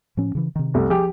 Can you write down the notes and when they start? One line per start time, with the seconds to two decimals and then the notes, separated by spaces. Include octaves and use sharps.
0.17 A2 F3 C#4
0.35 C#3 E3
0.56 C3 D#3
0.74 C2 A3
0.90 F3 G4 G#4